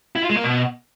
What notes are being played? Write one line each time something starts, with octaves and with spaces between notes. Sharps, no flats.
E4
F4
G#3
A#3
B2